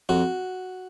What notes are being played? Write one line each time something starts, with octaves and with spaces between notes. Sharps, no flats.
F2 F#4